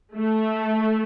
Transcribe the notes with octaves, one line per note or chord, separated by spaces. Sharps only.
A3